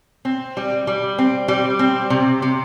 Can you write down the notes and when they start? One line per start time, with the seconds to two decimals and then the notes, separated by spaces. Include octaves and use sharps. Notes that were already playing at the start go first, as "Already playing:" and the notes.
0.25 C4
0.57 G3
0.87 G3
1.18 C4
1.48 G3
1.79 C4
2.10 C3
2.42 C3